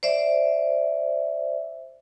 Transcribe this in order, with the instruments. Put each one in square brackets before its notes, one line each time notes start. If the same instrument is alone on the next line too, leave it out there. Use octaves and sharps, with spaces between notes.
[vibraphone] C5 D5 E5